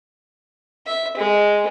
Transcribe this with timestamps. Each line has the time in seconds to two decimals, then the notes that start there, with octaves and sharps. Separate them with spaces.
0.87 E5
1.17 G#3